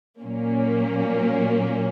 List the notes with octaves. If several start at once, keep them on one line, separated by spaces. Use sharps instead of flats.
A#2 F#3 A#3 C#4